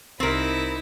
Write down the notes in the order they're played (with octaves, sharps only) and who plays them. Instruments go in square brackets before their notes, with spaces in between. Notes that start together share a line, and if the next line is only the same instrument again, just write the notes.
[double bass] C2 [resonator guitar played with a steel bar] C4 A#4 [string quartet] D#4 E4 B5